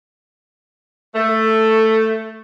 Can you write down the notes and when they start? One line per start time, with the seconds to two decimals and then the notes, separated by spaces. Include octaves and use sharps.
1.14 A3